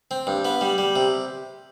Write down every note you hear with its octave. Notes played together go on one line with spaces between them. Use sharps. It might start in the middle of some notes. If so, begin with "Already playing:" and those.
C4
G2
B3
G3
G3
C3